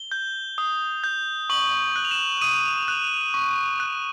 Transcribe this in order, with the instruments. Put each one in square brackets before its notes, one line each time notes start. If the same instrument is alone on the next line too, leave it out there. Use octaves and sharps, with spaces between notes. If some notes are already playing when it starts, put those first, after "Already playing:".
Already playing: [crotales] G7
G6
D#6
G6
C#6 F#7
F#6
F7
E7
D#6 D#7
F#6
C#6
F#6